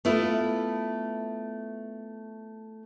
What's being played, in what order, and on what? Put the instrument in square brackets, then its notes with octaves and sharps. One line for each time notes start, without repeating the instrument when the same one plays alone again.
[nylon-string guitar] A3 B3 E4 F4